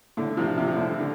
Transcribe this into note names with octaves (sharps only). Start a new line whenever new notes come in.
A2 D3
C3 F3
C3 F3
F3
A2 D3
D3